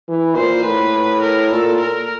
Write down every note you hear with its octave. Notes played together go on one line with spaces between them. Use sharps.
E3
A#2 C5
A2 B4
A#4
A#2 A4
A#4